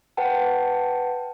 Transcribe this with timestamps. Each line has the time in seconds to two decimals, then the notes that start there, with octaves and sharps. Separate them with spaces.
0.17 B4 F#5 G5 A5